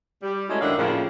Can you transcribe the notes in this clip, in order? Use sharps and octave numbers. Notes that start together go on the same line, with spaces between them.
G3
G#3 A3 C#4 D#4 E4 F#4
F#2 D#3 D4 E4 F5 F#5
A2 C#3 F3 A#3